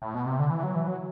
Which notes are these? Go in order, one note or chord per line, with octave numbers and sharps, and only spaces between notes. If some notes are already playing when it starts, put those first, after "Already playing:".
A2
B2
C3
D3
E3
F#3
E3
F#3